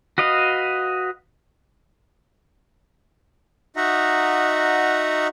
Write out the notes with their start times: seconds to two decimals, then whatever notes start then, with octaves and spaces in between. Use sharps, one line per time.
0.18 F#4 B4 D#5 F5
3.77 D#4 F#4 D#5 E5 F#5 A#5